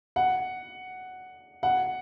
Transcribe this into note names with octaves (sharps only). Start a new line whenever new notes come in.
F#5
F#5